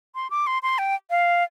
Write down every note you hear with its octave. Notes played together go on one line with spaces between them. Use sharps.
C6
D6
C6
C6
G5
F5